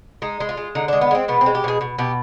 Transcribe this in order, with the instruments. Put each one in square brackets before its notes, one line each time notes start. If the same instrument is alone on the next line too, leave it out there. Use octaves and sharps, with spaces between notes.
[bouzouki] G#3 D#4
G#3
F4
G#3
D3 D#4
D4
G#3
B3
G#3 C4
B2 B3
C4
G#3
G4
B2 G#4
B2
B2 G4